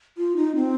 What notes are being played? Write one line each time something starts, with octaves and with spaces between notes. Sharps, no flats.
F4
D#4
C4